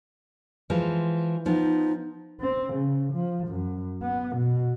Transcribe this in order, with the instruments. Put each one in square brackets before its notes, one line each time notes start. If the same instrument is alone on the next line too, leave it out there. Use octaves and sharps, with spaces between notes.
[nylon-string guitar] E3 F3 G#3
[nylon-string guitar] F3 B3 [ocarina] D#4
[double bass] C4
C#3
F3
F#2
B3
B2